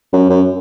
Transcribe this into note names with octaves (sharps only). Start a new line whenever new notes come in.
F#2
F#2